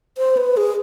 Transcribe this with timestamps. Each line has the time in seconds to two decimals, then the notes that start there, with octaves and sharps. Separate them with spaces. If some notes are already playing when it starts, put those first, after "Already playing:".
0.18 C5
0.37 B4
0.57 G#4